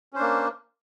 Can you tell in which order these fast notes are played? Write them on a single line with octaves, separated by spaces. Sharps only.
C#4 C5 D4 A#3